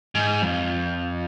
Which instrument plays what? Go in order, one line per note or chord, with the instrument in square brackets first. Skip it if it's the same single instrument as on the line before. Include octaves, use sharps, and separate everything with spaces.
[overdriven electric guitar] G#2
F2